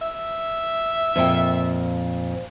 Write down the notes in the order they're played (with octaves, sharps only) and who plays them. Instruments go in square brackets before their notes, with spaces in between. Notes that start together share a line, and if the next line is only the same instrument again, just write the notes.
[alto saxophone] E5
[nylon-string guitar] F2 A#2 G5